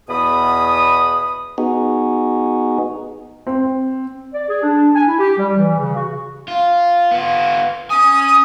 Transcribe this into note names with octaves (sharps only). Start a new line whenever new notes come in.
E2 B2 G#4 B5 D#6
B3 D#4 F#4 G#4
C4
D5
G#4
D4
G#5
E4
G4
G3
E3
C#3
F#4
F4
B3 F4
C#4 G#5 D#6